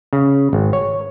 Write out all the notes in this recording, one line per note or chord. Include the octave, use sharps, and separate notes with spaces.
C#3
G#1
C#5